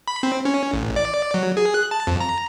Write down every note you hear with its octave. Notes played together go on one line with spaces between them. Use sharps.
B5
C4
C#4
A1
D5
F#3
G#4
F#6
A5
F2
A#5